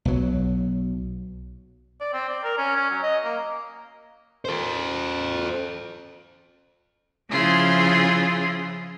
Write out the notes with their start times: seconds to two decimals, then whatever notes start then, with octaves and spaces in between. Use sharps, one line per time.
0.05 B1 F#3
2.00 D5
2.13 C4
2.28 D5
2.44 A#4
2.58 C#4
2.77 C#4
2.90 F#3
3.03 D#5
3.24 A#3
4.45 A4 C5
7.29 C#3 F3 E4 F4 G#4